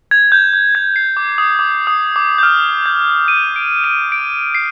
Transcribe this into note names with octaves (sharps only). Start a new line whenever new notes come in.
G#6
G6
G6
G#6
C7
D6
D#6
D6
D#6
D6
G6
F6
G6
D#7
D7
D#7
D7
C7